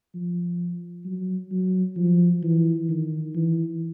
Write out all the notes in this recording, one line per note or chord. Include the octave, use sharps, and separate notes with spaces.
F3
F#3
F#3
F3
E3
D#3
E3